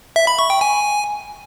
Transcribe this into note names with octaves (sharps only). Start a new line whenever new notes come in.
E5
B5
C#6
G5
G#5